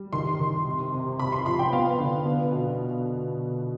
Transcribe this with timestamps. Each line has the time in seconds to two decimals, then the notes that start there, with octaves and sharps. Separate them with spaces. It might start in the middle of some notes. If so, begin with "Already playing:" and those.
Already playing: G3
0.13 D#3 C6
0.40 D#3
0.66 C3
0.93 C3
1.19 C3 B5
1.32 C6
1.46 F3 B5
1.59 G5
1.72 B3 F5
1.99 D3
2.26 B3
2.52 B2